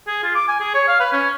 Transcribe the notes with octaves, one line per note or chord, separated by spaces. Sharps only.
G#4
F4
D6
G#5
G#4
C#5
F5
B4
C#4